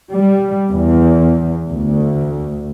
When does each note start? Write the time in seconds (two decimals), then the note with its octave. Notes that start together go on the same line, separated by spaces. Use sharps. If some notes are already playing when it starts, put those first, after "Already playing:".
0.12 G3
0.71 E2
1.68 D2